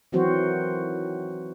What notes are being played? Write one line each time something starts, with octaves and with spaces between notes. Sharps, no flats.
D#3 E3 F#3 C4 F#4 C5